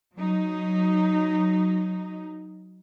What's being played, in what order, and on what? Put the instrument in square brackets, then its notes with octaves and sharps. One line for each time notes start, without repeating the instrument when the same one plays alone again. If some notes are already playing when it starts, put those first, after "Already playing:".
[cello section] F#3 D#4